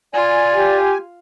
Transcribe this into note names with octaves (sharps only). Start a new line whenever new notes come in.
F4 D5 G#5
G4